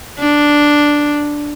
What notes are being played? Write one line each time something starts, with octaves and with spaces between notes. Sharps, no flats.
D4